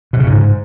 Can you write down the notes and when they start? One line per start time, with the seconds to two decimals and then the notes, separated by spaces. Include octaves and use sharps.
0.13 B2
0.20 C#3
0.26 G#2